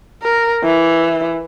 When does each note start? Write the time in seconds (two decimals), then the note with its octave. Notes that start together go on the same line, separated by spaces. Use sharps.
0.23 A#4
0.64 E3